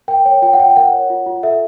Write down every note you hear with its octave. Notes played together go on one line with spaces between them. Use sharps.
A#4 G5
C#5 G5
F4 G5
F#5
F4 G5
G5
A#4 F#5
C#5
F4
F4
A4 E5